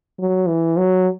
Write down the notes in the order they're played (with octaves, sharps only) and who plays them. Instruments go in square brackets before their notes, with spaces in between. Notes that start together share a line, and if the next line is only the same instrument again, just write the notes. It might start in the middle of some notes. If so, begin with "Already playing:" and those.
[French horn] F#3
E3
F#3